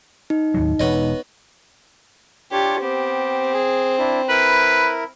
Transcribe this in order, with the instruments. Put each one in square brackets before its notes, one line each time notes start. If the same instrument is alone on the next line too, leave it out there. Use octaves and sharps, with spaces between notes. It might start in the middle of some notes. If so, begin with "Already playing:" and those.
[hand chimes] D#4
[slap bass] D#2 A2 F#3
[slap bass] E1 [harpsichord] B3 C#5 D#5
[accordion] D4 F4 C#5 [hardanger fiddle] G4
[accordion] B3 G4 [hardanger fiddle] C4
[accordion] G#4
D4 E4
[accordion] E4 A#4 [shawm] B4